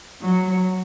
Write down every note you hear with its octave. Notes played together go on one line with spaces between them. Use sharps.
F#3